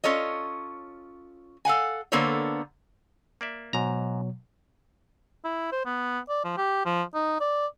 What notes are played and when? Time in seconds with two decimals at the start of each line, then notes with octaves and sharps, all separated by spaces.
0.04 C#4 F4 A4 C#5 D#5
1.65 A4 F5 F#5 G#5
2.12 D3 A#3 B3 A4 C5 C#5
3.41 A#3 D5 E5
3.73 G#2 B2 F#3 A#5
5.44 E4
5.72 C5
5.85 B3
6.29 D5
6.44 F3
6.57 G4
6.85 F3
7.14 D#4
7.40 D5